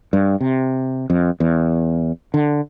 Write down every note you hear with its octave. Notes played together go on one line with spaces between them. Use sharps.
G2
C3
F2
E2
D3